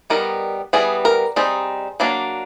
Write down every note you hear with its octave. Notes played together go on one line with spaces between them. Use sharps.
D#3 G3 B3 D#4 A#4
E3 G3 B3 G#4
A#4
G3 C4 D#4 G#4
F#3 A#3 D4